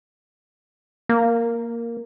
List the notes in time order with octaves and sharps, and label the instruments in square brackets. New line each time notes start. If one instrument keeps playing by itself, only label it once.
[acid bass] A#3